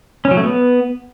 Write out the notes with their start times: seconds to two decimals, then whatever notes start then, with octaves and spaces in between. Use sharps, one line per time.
0.25 C#4
0.31 F#3
0.37 A3
0.43 B3